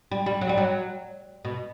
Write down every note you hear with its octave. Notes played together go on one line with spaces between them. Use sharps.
G3
G3
F#3
G3
F#3
B2